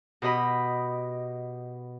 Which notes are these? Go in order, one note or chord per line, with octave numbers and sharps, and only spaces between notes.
B2 G4 D#5 B5